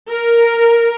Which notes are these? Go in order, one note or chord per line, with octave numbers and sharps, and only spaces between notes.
A#4